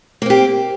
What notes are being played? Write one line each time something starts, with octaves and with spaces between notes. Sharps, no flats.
A#3 C4 G4